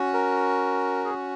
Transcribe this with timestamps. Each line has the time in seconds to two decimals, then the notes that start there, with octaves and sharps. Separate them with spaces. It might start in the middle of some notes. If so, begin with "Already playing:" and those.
Already playing: C#4 F#4
0.14 A#4
1.05 G#4